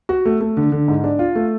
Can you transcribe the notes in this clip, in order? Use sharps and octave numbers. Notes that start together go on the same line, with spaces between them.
F#4
A3
A3
D3
D3
G#2
D4
F4
A3